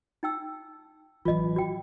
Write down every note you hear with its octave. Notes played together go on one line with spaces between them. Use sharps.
D#4 G5 E6
A1 E3 F#3 F4 D#5
F#4 G5